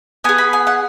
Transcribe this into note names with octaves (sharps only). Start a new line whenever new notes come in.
B3 G#4 G#5
B5
G#5
F#5